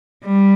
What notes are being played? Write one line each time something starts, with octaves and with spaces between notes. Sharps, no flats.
G3